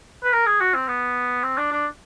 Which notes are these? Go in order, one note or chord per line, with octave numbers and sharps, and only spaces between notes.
B4
A#4
G#4
F#4
C4
B3
C4
D4
D4